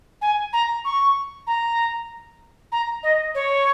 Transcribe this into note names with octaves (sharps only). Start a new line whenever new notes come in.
G#5
A#5
C#6
A#5
A#5
D#5
C#5